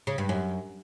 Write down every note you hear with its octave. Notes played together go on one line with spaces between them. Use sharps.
C#3
G2
F#2